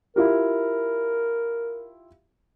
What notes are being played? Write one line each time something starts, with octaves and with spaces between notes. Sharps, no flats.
E4 F4 G4 A#4